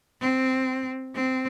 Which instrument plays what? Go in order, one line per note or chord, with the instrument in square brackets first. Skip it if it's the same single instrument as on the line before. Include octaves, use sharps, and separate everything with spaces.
[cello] C4
C4